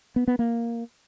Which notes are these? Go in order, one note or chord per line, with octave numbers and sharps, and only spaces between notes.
B3
B3
A#3